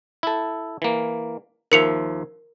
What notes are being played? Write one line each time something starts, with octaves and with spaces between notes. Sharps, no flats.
E4 A4
E3 A#3
D#2 F3 A#4 E5 C#7 F7